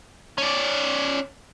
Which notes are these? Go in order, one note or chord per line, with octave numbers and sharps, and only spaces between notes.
C#4 D5